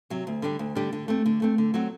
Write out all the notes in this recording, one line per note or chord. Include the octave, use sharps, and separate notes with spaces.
C3 F#3
D2
D3 G3 D4 G4
D2
D3 G3 D4 G4
D3
A3 C4
D3
A3 C4
D3
F#3 C4 F#4